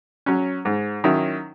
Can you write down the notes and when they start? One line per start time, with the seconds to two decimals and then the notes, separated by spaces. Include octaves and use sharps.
0.26 F#3 C#4
0.65 G#2
1.04 D#3 F#3 C#4 E4